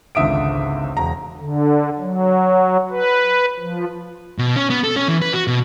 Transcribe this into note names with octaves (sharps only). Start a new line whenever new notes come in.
G#1 C#2 D3 E5 D#6 D7
E1 A#5
D3
F#3
B4
F3
B2
C#4
B3
A4
C#4
E3
B4
F#4
B2